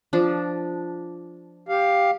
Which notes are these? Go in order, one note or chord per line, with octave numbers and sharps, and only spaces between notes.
F3 D4
G4 F5